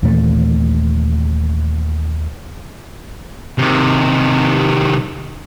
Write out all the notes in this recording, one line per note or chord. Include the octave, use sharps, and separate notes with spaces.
D#2 A#2 E3 A3
C3 D#3